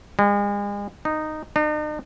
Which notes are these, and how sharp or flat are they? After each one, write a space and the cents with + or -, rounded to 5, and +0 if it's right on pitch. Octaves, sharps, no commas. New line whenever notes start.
G#3 -40
D#4 -10
D#4 -45